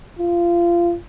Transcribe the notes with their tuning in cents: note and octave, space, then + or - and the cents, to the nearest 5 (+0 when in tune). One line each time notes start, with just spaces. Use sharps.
F4 -20